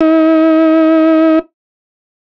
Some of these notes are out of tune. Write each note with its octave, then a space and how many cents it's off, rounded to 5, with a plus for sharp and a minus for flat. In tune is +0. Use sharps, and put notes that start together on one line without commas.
D#4 +45